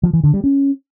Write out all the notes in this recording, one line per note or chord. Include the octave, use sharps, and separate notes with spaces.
F3
E3
D3
G3
C#4